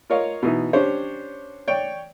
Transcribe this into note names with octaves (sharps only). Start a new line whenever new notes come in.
F4 A#4 C#5 D#5 F5
B2 E3 D#4
C#4 D4 G4 C5 C#5
C#5 D5 G5